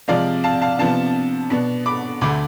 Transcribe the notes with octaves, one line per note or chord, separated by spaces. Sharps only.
C3 F3 G#3 D5 F5
F5 A5
F5 A5
C3 F3 B3 D4 F5 A5
B2 B3 D4
B5 D6
D2 D3 A3 B5 D6